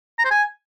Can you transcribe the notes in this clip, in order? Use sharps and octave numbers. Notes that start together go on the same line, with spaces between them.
A#5
C5
G#5